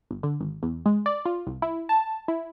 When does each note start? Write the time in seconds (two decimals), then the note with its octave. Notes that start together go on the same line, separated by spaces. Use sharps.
0.11 G1
0.23 D3
0.40 G#1
0.63 E2
0.86 G#3
1.06 D5
1.25 F4
1.47 C2
1.62 E4
1.89 A5
2.28 E4